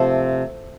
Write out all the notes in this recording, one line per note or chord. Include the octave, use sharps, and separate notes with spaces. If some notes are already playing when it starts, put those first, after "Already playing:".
Already playing: C3 F3 A3 C5